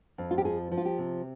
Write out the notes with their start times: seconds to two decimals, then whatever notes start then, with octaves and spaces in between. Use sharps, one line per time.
0.18 F2
0.31 F4
0.38 G4
0.45 F3 G#4
0.72 F3
0.77 F4
0.85 G4
0.98 C3